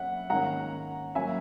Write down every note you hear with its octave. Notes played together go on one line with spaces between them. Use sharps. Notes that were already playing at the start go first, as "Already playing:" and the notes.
Already playing: F#3 A#3 C#4 E5 F#5
G#2 D#3 A#3 C#4 F#5 A#5
F#3 A#3 C#4 E5 G#5